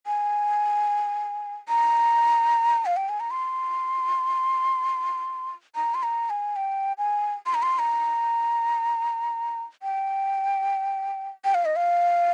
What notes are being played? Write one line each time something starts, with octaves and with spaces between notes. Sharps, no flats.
G#5
A#5
F5
G5
G#5
A#5
C6
A#5
C6
A#5
G#5
G5
G#5
C6
A#5
C6
A#5
G5
G5
F5
D#5
F5